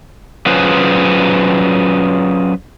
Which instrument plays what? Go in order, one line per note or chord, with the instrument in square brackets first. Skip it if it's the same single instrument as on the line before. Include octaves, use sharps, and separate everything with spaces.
[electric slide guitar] F#3 C#4 F4 G#4 B4 C5